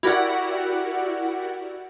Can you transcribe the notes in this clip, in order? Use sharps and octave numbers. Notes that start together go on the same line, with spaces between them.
E4 F#4 G4 A#4 D5 F#5